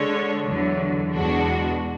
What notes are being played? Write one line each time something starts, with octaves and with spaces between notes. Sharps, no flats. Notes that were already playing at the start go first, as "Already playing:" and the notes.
Already playing: D3 G#3 D4 A4 C#5
E2 D3 F#3
E2 B2 G#3 D4 F#4